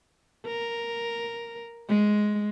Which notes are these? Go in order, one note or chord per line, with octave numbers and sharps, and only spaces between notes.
A#4
G#3